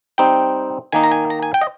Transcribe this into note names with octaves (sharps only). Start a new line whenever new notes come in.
G3 C4 D#4 G5
D#3 A#3 D#4 G#5
A#5
G#5
A#5
G#5
G5
D#5